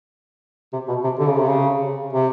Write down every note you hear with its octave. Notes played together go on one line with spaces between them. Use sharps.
C3
B2
C3
D3
C#3
C3
C#3
C3